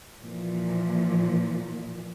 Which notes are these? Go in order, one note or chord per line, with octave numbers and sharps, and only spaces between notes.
A#2 E3 F3